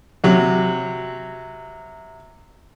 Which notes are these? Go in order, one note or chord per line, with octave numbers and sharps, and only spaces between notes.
C3 F#3